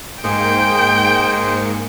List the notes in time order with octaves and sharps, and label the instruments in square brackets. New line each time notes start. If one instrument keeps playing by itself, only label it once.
[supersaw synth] G#2 A#3 C#7 [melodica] G#4 C5 D#5 [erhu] G5